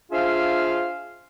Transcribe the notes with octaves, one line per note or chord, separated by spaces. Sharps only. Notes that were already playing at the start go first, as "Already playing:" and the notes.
D4 F4 G#4 C5 E5 F5